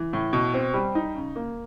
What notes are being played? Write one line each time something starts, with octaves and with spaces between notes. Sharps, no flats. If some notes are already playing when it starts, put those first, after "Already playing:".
Already playing: E3
A2
B2
C4
G3
D#4
C#3
A#3